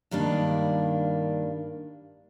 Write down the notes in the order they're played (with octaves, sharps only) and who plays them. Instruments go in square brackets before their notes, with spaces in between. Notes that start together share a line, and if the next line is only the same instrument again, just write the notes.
[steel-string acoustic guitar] G2 D#3 G3 A#3 D4